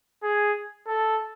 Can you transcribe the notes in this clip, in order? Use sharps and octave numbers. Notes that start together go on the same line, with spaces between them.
G#4
A4